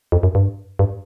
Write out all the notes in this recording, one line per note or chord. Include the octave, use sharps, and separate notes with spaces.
F2
F#2
G2
G2